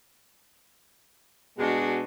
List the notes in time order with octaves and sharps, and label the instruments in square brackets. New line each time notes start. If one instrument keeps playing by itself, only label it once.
[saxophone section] B2 G#3 [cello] D4 F#4